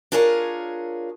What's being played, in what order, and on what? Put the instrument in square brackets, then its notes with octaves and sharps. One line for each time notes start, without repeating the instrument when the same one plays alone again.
[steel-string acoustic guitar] D4 F4 G#4 A#4 C#5